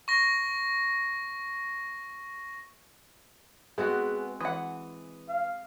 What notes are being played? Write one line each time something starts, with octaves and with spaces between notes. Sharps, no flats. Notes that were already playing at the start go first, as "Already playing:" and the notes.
C#6 A#6
G#3 B3 C4 F#4 G#4
E3 F#5 D#6
F5